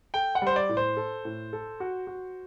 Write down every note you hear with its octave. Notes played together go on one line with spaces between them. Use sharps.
A4 G5
F#5
G3 C5
D5
A2
C5
A4
A2
A4
F#4
F#4